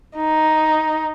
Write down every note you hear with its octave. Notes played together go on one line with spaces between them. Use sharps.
D#4